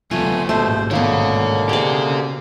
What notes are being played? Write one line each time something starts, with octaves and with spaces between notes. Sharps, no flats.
D2 A#2 F#3 A3 B3 F4 G#5
A1 D#2 G#2 B2 G#3 A3 C5
B2 D3 D#3 A#3 B3 C#5 F5
C#3 G4 G#4 C5 D5